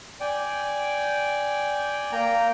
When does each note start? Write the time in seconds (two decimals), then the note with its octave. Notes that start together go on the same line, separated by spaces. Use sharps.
0.20 D5 G5 G#5
2.12 A#3 G5 A#5